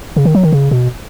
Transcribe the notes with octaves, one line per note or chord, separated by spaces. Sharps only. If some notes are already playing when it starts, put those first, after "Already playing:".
C#3
D#3
F#3
D#3
C#3
B2